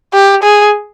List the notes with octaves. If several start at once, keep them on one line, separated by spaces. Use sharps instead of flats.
G4
G#4